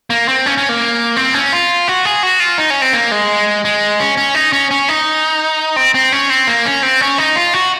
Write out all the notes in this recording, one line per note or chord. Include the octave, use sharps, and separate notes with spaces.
A#3
C4
C#4
C#4
A#3
C4
C#4
F4
F#4
G#4
F#4
F4
D#4
C#4
C4
A#3
G#3
G#3
C#4
C#4
D#4
C#4
C#4
D#4
C4
C4
C#4
C4
A#3
C#4
C4
C#4
D#4
F4
F#4